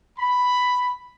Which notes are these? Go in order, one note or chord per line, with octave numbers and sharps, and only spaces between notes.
B5